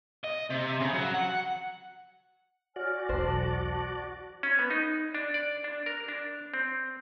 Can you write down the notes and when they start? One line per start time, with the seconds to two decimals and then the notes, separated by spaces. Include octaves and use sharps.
0.24 D#5
0.50 C3
0.80 C#3
0.93 F#3
1.14 F#5
2.76 F#4 C#5 D5 G#5 F6
3.09 B1 E2 C5 A5
4.43 C#4
4.59 B3
4.70 D#4
5.15 D4
5.34 D5
5.64 D4
5.86 A#4
6.08 D4
6.54 C4